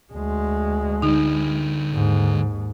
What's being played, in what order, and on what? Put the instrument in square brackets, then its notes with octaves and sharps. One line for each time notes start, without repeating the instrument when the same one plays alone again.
[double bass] D2 G#3
[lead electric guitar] D3 B4 [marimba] D#4
[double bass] D#2 G#2